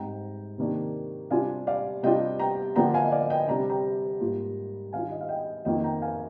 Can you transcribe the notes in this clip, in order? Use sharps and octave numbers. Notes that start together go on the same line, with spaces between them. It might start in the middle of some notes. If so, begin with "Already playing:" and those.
Already playing: G#2 G3 C4 D#4 G5 A#5
C3 D#3 A#3 D4
C3 G3 D4 F4 F5 G#5
D5 F5
C3 G3 D4 F4 D#5 G5
G5 A#5
D3 F3 A#3 D4 G5 A#5
F5 G#5
D#5
D5 F5
D#5 G5
C3 G3 D4 A#5
G5 A#5
G#2 G3 A#3 F4
D#3 G3 D4 F4 F5 G#5
D#5
F5
D#5 G5
F2 D#3 A#3 F4 D#5 G5
G5 A#5
F5 G#5